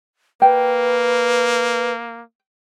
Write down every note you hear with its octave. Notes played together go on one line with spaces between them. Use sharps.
A#3 B4 G5